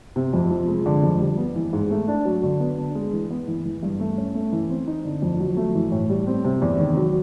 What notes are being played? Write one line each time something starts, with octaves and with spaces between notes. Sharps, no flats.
C3
F2
F3
G#3
D3
F2
G3
B3
E3
G#2
A3
D4
F#3
D3
B3
D4
G#3
E3
B3
E3
E3
G2
A3
C#4
A3
E3
C4
D#4
D3
F2
F#3
A3
E3
A2
G3
C4
C3
E2
D#3
F#3